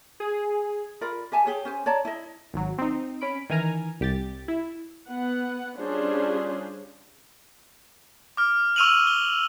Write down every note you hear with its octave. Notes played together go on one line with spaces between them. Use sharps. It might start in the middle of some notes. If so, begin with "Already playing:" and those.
G#4
F4 A#4 D5 B5
G4 E5 G#5 A5
G4 G#4 C#5
C#4 C5 G#5
C#5 D5 A5 A#5
E4 D#5
G#1 F#3
C4 D#4
C#4 B5 D7
D#3 E3 G#5 A#5 F6
C2 G4 A6
E4
B3 B4 F#5
G3 C#4 D4 F4 G#4 C5
D6 F6
C#6 E6 F6 D#7 F7 F#7
G7